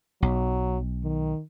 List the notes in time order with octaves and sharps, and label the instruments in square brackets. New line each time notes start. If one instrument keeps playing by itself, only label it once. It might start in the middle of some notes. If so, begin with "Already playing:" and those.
[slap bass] B1 [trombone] F#3
[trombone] D#3